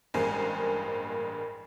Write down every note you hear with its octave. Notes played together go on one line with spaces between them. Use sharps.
A1 G2 G#3 A#3 C5 G#5